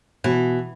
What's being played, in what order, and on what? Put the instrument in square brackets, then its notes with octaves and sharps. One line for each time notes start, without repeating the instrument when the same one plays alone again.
[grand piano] B2 [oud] E3